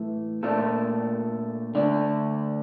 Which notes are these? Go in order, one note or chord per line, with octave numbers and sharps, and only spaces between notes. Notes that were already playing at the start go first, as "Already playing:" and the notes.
Already playing: A2 E3 A3
A#2 A3 D4 A4
D3 A3 D4